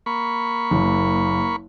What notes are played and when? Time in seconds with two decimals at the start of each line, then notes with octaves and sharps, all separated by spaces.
0.06 A#3 B5 C#6
0.71 F#1